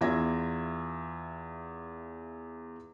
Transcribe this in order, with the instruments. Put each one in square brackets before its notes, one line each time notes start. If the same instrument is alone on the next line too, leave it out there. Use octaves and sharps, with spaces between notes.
[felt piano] E2 F4 E5 G#6 A#6